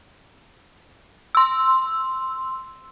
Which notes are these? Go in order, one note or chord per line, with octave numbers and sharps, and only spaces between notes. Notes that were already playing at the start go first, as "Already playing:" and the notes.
C6 E6